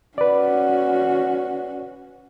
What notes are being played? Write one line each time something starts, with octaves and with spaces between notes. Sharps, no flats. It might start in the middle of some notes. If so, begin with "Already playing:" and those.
C#4 F#4 B4 D5